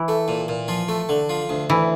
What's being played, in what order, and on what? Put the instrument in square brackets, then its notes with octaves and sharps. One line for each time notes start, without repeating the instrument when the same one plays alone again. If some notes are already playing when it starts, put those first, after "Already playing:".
Already playing: [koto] E3
[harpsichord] A3
A#2
A#2
F3
A3
D3
F3
D2
[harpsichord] D2 [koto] E3